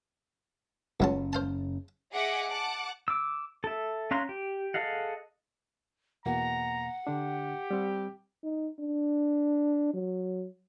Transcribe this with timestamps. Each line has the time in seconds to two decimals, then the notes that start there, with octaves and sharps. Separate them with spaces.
1.00 F#1 C#2 F#3 C#4 A5
1.33 C5 F5 A5
2.11 G#4 D#5 E5 F#5 D6
2.49 F#5 A5 D6
3.08 D6 E6
3.64 A4 E5
4.11 C#4 F5 A#5 C6 F#6
4.29 G4
4.74 G#4 A4 D#5 F5 F#5
6.26 E2 B2 A#3 F#5 A#5
7.07 D3 D4 G4
7.71 G3 C4
8.43 D#4
8.80 D4
9.94 F#3